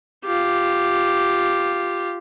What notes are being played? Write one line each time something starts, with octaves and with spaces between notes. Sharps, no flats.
F4 G4